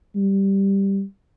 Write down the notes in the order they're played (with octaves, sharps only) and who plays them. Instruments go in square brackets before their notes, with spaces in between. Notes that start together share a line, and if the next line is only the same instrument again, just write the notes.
[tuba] G3